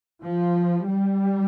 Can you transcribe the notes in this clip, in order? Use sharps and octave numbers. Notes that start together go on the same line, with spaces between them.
F3
G3